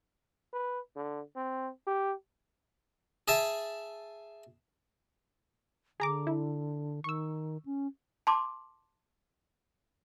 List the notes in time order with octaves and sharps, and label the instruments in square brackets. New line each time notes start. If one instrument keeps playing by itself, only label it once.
[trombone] B4
D3
C4
G4
[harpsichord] G#4 E5 A5
[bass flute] D3 [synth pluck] G#4 A#5 D6
[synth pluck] E4
[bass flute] D#3 [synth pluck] C#6 E6
[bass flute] C#4
[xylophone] A5 C6 D6